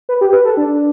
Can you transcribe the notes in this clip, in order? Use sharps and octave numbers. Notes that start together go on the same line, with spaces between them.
B4
G4
B4
A4
D4